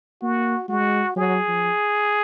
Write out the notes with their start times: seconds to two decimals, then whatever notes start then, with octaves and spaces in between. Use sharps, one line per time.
0.22 A#3 F#4
0.69 G#3 F#4
1.16 F#3 G#4
1.48 F3